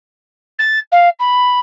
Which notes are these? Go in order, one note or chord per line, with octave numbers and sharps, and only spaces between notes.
A6
F5
B5